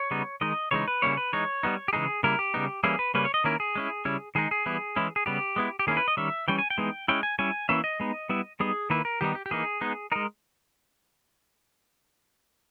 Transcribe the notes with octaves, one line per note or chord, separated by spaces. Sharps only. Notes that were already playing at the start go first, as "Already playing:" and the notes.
Already playing: C#5
C#3 G3 B3 D#4
D#3 G#3 D#4 D#5
C#3 E3 G#3 D#4 C#5
B4
C#3 G3 A#3 C#4 E4 C#5
B4
E3 G#3 D#4 C#5
G3 B3 D#4
G4
C#3 E3 G#3 D#4 G#4
C#3 G3 A#3 E4 A#4
G4
C#3 G3 B3 D#4
E3 G3 A#3 C#4 E4 G#4
B4
C#3 G3 A#3 C#4 B4
C#5
D#5
D#3 A#3 C#4 E4 A#4
G#4
G#3 C#4 E4
C#3 G3 C#4 E4
D#3 G#3 D#4 G#4
G#4
E3 G3 B3 E4
E3 G#3 C#4 E4
G#4
C#3 G3 B3 G4
G#3 B3 E4
G4
D#3 A#3 C#4 E4 G#4
B4
D#5
D#3 G3 C#4 E5
E3 G3 C#4 G5
G#5
G5
E3 G#3 B3 D#4
G#3 C#4 E4 G5
G#5
G3 C#4 E4 G#5
E3 A#3 C#4 E4 E5
D#5
G#3 B3 D#4
G3 B3 E4
G3 B3 D#4 G#4
D#3 A#3 E4 B4
A#4
D#3 G3 B3 D#4 G4
G4
G4
E3 A#3 D#4 G#4
G#3 B3 D#4
G#3 D#4 A#4